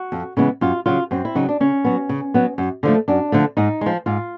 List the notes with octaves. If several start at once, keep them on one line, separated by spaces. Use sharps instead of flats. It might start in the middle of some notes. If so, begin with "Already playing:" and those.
Already playing: F#4
F2
C#3 E3 G#3 B3
F#2 F4
C#3 F#3 F4
F#2 C4
E4
C#3 F#3 D#4
D4
C#3 C#4
F#3 B3
C#3
F#3 B3
F#2
D3 F3 A3
F#2 D4
D3 F3 A3
G#2 D#4
F3 G#3
G#2 F4